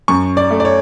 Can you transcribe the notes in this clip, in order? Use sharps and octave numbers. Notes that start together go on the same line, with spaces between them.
F#2 C#6
D5
A3
D5
C#5